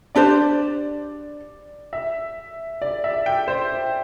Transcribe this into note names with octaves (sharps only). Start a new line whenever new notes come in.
D4 G4 C5 D5
E5
D5
E5
G5
C5